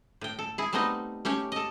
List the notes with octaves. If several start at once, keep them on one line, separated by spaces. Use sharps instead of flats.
A2 G5
A4
E4 G#4
G3 A3 B3 C4 D#4 D#5
A3 C#4 G4 C#5
A4 D#5